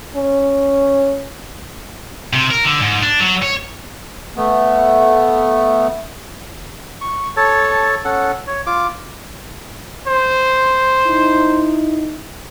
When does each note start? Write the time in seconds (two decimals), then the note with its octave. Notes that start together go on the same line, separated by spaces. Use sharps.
0.15 C#4
2.33 C3
2.51 A#4
2.64 D3
2.82 G#2
3.03 D4
3.20 F#3
3.42 C#5
4.37 A3 B3
7.01 C#6
7.37 A4 C#5 A5
8.05 C#4 A4 F#5
8.47 C#5
8.66 F4 D6
10.07 C5
11.06 D#4 E4